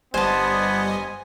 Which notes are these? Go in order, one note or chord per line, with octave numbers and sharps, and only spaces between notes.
G1 G3 B3 C5 D#5 G#5 A5